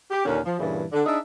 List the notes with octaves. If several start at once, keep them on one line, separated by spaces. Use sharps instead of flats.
G4
D#2 A#2 D3 C#4
F3
G2 A#2 C#3 E3
D3
D4 D#4 G#4 E5